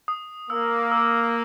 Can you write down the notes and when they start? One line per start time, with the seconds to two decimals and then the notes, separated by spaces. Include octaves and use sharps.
0.08 D#6
0.50 A#3 E6
0.92 E6